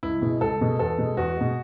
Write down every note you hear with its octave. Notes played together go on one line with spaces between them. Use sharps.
C#2 E4
B2 G#3
C#2 A4
B2 G#3
E2 A4
B2 G#3
E2 F#4
B2 G#3